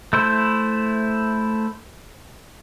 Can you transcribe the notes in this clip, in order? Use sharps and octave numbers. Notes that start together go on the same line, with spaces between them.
A3 E4 C5